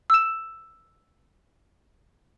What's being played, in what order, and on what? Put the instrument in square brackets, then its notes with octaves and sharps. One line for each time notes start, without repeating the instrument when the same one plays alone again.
[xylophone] E6 E7